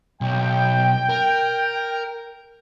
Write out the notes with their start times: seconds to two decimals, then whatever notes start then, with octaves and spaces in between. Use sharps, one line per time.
0.21 B1 G5
1.09 A#4